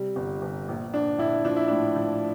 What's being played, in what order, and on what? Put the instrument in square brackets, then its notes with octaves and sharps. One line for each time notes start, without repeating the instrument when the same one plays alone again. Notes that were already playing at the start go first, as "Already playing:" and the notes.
Already playing: [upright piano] C3 G3
G1
G1
A#1
A#1 D4
A#1 E4
F3 D4
E4
A2 D4
F3